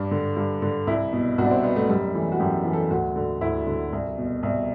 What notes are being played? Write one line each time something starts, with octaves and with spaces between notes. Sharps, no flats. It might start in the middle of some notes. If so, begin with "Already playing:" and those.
Already playing: G2 D4
D3
G2
D3
C2 E4
B2
C2 F#4
D4
C4
B2 B3
A3
F#2 G3
E3 A3
F#4
F#2 G4
E3
A4
D2 F#4
D3
D2 E4
D3
C2
B2
C2